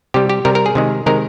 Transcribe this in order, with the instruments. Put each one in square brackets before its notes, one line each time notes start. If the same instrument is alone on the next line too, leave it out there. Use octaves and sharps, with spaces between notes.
[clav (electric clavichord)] C3 G3 G4
G4
C3 G3 A#4
A#4
G#4
C3 D#3 G#3
C3 D#3 G#3 A#4